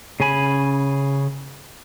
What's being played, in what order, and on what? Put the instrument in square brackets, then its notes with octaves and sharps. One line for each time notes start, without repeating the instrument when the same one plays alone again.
[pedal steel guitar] C#3 C#4 G#5 B5